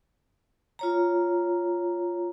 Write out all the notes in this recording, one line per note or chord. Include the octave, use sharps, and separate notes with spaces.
F4 C#5 A#5